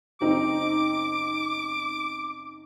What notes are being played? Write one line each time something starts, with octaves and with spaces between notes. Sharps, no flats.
F#1 C4 D#4 D6